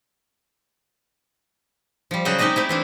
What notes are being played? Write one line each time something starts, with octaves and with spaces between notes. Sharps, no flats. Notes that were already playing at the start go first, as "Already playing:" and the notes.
F3 G3
C#3 F#3 F#4 G#4 C5 G5
G#3 C4 D#4 G4 D#5 G5
A3 C4 E4
E3 C4 D4